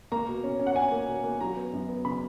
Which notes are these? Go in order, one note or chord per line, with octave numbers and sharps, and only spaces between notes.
A#3 A#5
B2
C#4
C#4
F#5
C#4 G#5
A#3
B2
A#3
F#3 A#5
B3
F#2
B3
C#3 B5